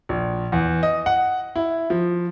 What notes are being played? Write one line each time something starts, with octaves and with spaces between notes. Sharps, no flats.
A#1
E2
D#5
F#5
E4
F3